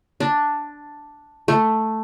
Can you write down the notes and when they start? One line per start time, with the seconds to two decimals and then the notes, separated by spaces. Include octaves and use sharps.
0.20 D4
1.48 A3